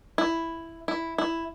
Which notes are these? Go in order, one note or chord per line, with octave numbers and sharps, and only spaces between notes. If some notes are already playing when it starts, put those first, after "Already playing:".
E4
E4
E4